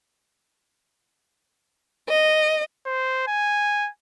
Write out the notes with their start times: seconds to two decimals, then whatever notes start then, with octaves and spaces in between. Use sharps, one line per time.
2.08 D#5
2.86 C5
3.27 G#5